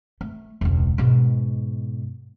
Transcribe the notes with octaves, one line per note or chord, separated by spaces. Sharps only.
A3
E1 C#2
G#2 B2